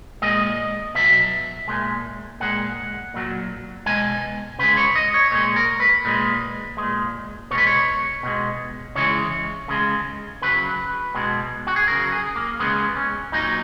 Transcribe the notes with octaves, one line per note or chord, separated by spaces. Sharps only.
A#2 G#3 D#5
B2 F#3 E5
A#2 G#3
A#2 G#3 F#5
A#2 F#3
B2 G#3 G#5
C#3 G#3 B4
C#5
D#5
C#5
A#2 G#3 C#5
A#4
B4
A#2 G#3
G#3
A#2
B2 G#3 B4 C#5
C#5
B2 G#3
C#3 E3 G#3 C#5
C#3 G#3
C#3 F#3 B4
B2 G#3
F#4
G#4
C#3 F#3 A#4
G#4
A#3
C#3 G#3 B3
C#4
A#2 F#3 D#4